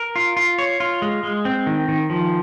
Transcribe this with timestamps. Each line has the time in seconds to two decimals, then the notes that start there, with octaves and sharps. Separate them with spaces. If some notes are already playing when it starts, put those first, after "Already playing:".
Already playing: A#4
0.16 F4
0.37 F4
0.58 C#5
0.80 F4
1.02 G#3
1.23 G#3
1.45 C4
1.67 D#3
1.88 D#3
2.10 F3